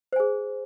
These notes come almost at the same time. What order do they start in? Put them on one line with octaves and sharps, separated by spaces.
C5 G#5 G#4